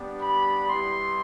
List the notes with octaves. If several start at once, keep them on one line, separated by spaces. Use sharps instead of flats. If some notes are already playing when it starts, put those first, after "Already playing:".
Already playing: G3 B3 D4 G4
B5
G3 B3 E4 G4 C6